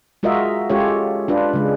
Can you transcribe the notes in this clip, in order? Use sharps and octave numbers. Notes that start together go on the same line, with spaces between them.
G#3 F4 F#4 A#4 D#5 E5
G#3 C#4 F4 G4 A4 C#5
D4 F4 B4
C#3 G#3